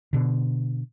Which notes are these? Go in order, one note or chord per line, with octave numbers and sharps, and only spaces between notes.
B2 D3